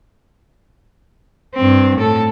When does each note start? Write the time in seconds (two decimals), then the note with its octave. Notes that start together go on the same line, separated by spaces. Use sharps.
1.55 G2 C4
1.99 A2 A4